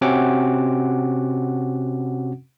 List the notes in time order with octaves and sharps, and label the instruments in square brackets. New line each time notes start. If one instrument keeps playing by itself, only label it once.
[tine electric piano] C3 C4 C#4 F#4 F#5 D6